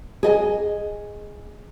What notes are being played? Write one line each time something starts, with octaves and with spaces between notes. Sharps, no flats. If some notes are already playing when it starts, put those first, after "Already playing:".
G#4 D#5 G#5